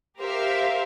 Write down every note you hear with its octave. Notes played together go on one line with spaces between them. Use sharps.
G4 A#4 C5 E5 F5